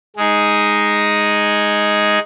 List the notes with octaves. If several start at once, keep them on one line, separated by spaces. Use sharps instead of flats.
G#3 D#4 G#4